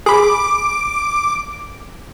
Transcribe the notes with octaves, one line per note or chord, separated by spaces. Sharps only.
G#4 B5 D6